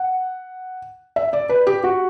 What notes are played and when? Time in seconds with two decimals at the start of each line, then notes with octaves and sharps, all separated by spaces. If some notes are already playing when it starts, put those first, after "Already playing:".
Already playing: F#5
1.16 E5
1.33 D5
1.49 B4
1.67 G4
1.84 F#4